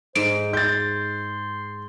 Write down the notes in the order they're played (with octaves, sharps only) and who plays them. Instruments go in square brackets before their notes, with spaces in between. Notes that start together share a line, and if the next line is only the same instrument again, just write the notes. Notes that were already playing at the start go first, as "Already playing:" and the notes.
[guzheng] G#2 [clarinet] C5 [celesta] D7
[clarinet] C6 [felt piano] G6 A6